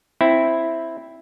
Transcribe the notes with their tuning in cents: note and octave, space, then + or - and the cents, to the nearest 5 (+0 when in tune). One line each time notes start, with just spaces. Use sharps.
C4 +0 E4 +0